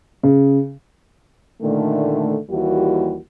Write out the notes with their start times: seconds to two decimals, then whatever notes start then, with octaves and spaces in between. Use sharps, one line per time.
0.23 C#3
1.61 A#2 D3 D#3 A3
2.50 D#2 E3 G3 A#3 E4 F#4